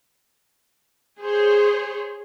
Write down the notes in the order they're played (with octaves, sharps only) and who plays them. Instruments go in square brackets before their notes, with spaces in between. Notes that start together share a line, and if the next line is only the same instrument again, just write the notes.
[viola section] G#4 C5 C#5